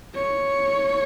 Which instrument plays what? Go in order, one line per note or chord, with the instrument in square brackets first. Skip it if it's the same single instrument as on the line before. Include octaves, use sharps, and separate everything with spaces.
[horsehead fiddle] C#5